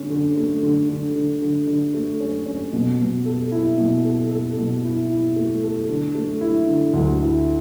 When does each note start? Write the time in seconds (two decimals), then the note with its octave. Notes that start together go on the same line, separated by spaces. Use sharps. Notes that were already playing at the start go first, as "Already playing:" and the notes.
Already playing: D3 C#4
0.10 D3
0.37 A3
0.63 D3
0.89 D3
1.15 D3
1.42 D3
1.67 D3
1.94 A3
2.21 C#4
2.46 C#4
2.73 B2
2.99 B2
3.26 A4
3.52 E4
3.78 B2
4.05 A4
4.31 A4
4.57 B2
4.84 E4
5.10 E4
5.36 A3
5.63 A4
5.89 D3
6.15 A3
6.41 E4
6.67 D3
6.94 D2
7.20 E4